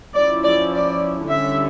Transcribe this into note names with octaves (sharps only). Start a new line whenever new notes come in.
F3 C#4 E4 D5
D5
D5
D3 G3 C#4 E4 E5